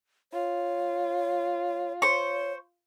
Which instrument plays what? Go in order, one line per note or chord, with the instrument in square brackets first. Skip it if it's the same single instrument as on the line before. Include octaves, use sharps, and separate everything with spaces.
[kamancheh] F4 [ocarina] C#5
[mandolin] C5 C#6 [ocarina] C#5